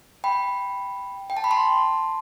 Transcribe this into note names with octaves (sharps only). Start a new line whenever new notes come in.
G5 B5
G5
A5
B5
A5 C6